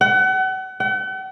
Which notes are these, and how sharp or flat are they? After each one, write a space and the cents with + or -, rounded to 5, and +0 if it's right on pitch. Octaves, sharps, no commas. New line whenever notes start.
F#5 +35
F#5 +45